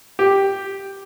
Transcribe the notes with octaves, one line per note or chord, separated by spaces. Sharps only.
G4